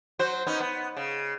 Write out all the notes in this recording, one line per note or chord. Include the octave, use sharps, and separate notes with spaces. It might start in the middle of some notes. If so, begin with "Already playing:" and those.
F#3 F#4 C5
B3 C#4 D#4
B3
C#3